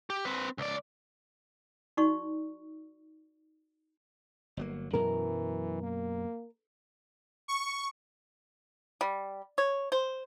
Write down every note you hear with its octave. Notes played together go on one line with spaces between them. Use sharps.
G4
C4 B4
C#2 D5
D#4 F#4 D5 C#6
G1 F#3 A#3
F#2 B2 E3 F#3 A#4
A#3
C#6
G3
C#5
C5